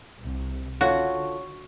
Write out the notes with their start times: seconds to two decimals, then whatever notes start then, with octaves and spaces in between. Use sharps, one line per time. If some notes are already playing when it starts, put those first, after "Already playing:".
0.20 C2 C3
0.81 D3 F4 F#4 A4 C#5